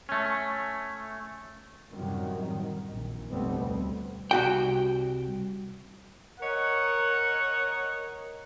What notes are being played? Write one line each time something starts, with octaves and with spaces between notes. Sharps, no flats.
A3 C#4
F#2 A2 C3 D#3 F#3 G3
D#3
A#1
F1 B2 G3 A3 B3 C4
D2 C4
C2 F#4 G5
A#4 C#5 D#5 F#5